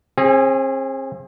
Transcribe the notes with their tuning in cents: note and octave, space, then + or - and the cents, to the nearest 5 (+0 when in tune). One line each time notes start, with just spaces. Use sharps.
C4 +40 G#4 -10